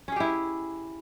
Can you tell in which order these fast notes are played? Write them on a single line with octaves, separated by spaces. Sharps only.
C#4 G#4 G4 E4